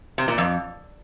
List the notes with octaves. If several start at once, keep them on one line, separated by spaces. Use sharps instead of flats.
C3
A#2
F2